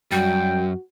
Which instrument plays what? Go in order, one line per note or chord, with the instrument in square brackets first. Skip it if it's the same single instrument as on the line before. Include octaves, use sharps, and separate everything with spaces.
[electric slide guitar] F#2 [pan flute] G3 [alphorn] F#4 [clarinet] G5